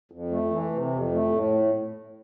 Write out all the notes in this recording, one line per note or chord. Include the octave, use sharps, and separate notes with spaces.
F2
A3
E3
C3
F2
A3
A2